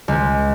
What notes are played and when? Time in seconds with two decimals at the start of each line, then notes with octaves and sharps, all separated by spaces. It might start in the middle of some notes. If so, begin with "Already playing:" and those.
0.08 C#2